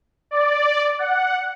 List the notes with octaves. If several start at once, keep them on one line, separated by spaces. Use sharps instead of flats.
D5
F#5